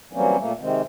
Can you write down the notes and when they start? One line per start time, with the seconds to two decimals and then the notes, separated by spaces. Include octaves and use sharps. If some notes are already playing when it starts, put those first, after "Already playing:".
0.13 E3 F#3 G3 A#3 C4 C#4
0.38 A#2 A3 A#3
0.60 C3 D#3 G#3 C4